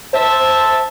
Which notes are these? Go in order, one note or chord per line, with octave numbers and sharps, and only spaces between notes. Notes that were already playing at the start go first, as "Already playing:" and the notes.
C5 E5 A5